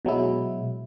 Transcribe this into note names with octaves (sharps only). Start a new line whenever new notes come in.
B2 F#3 G#3 E4